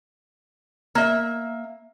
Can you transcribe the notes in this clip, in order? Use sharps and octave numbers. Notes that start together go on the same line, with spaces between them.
A#3 E5